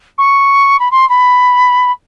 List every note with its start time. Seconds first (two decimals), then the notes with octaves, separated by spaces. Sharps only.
0.18 C#6
0.79 B5
0.91 C6
1.09 B5